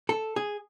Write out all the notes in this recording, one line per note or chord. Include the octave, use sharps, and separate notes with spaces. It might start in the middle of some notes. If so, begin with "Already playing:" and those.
A4
G#4